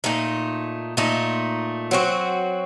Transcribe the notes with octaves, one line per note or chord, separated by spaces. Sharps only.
A#2 A3 D#4
A#2 A3 D#4
F#3 C4 F#4